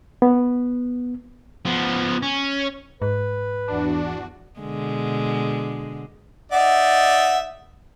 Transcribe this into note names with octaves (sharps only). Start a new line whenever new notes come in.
B3
F3 B3
C#4
G#2 B4
E2 D4 F#4
B2 D3 G#3
D#4 D5 E5 F#5